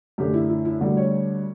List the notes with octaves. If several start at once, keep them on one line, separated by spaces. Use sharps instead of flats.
F#2 D3 A3 G4
E4
E4
E4
D2 D3 G3 F#4
C#5